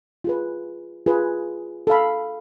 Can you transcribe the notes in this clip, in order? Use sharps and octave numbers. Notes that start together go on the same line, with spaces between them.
F4 G#4 B4
F4 G#4 B4
A4 F5 B5